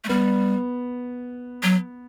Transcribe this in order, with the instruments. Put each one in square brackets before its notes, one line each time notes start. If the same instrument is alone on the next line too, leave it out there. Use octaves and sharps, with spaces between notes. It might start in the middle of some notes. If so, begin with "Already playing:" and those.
[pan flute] A3
[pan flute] G3 [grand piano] B3
[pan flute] F#3